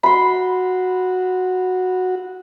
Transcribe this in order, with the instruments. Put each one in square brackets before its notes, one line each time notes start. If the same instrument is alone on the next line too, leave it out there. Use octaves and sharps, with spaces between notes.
[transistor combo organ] F#4 [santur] B5 C6